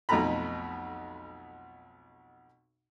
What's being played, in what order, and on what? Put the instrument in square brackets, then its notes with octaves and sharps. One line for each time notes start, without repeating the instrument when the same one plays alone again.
[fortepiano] B1 F2 B2 A3 A#5 B5